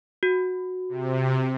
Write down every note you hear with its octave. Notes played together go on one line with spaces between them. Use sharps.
F#4
C3